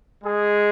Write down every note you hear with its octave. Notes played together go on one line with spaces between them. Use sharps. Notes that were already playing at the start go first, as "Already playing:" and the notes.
G#3 G#4